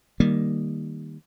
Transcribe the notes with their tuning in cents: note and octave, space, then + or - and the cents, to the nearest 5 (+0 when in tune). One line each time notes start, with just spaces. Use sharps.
D#3 +0 G3 +10 A#3 +0